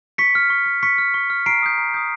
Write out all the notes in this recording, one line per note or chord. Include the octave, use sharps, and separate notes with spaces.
C#6 B6 C#7
F6
C#6
F6
C#6 B6 C#7
F6
C#6
F6
A#5 C7 D7
D#6 G6
A#5
D#6 G6